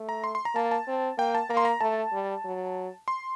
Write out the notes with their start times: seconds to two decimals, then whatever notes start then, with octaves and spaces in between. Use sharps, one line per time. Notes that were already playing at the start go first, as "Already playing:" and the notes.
Already playing: A3
0.09 A#5
0.24 C6
0.35 C6
0.45 A#5
0.55 A#3 A5
0.71 A5
0.87 C4
1.18 A#3 G5
1.35 A5
1.49 A#3 A#5
1.57 C6
1.65 A#5
1.81 A3 A5
2.12 G3
2.45 F#3
3.08 C6